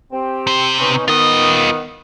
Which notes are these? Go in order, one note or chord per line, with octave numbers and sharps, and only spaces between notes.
C4 G4
C3 C5
B3 C#4 D#4
D#3 B3 F4 D#5